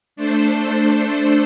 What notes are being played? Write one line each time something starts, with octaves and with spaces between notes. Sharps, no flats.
A3 D4 A4 C5